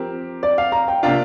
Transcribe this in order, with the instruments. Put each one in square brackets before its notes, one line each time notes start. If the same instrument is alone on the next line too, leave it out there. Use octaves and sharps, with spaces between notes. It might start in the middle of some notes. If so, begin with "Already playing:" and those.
Already playing: [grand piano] F3 C4 G4 A#4
[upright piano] D5
F5
A#5
G5
[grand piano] C3 A#3 D4 F4 [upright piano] F5